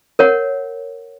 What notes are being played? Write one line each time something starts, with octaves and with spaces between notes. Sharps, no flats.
A#4 C#5 F#5